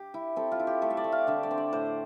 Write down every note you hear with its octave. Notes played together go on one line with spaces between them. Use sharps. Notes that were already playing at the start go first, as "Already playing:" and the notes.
Already playing: G4
E4
C4 A4
F4
E4
G4
A3 A4
E5
D5
A3
F5
D3 E5
D5
C4
D5
A2 C5